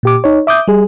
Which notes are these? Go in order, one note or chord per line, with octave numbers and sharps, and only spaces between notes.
A#2 G4 D6
D#4 C#5
E5 D6 D#6 G6
G3 G#4